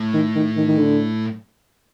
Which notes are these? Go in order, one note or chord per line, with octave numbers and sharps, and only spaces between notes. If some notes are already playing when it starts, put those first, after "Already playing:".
Already playing: A2
D#3
D#3
D#3
D#3
D3